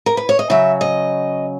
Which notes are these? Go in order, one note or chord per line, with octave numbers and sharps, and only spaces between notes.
A#4
B4
C#5
D#5
C#3 F#3 E5
D#5